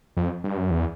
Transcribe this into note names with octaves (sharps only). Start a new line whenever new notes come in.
F2
G2
F#2
E2